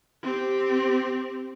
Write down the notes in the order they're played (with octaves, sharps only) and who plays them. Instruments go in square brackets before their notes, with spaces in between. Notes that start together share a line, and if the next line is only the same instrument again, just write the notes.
[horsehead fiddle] C4 G4